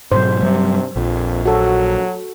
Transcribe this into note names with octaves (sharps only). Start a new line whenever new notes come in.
A1 G#2 B2 F#3 C5
G2 C3 F#3 G3
A#1 F2
F#3 F#4 A4